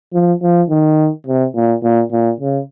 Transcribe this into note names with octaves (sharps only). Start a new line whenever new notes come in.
F3
F3
D#3
C3
A#2
A#2
A#2
C#3